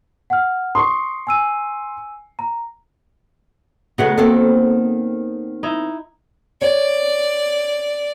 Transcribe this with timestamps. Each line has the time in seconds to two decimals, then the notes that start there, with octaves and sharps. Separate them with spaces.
0.30 F#5 F6
0.75 C6 C#6 D#6 C7
1.27 G#5 E6 D#7
2.39 A#5
3.98 C#3 F#3 G#3 A3 B3 F#5
4.18 D#3 A#3 C4 A4
5.63 D#4 E4
6.62 C#5 D5